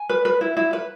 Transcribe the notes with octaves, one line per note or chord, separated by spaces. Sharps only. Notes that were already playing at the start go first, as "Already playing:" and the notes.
Already playing: G#5
B4
B4
E4
E4
B4